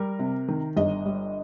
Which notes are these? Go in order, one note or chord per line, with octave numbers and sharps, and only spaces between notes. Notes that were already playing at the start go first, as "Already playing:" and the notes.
Already playing: G3 A#4
C3
D#3
G1 D#5
G3